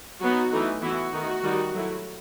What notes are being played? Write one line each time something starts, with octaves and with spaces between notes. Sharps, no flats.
F#3 B3 D#4 F#4
E3 A3 D#4
E3 B3 E4 F#4
D#3 A3 D#4
D#3 G3 D#4
F#3 A3 E4